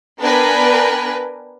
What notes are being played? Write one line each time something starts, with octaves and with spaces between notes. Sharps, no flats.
B3 D4 A#4 B4 G5 G#5